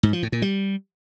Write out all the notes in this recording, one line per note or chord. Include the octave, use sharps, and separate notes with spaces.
G#2
F3
A2
A#2
G3